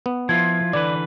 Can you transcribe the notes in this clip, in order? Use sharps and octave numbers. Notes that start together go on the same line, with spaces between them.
B3
F3 E4 F4 G#6
D3 E3 B4 D5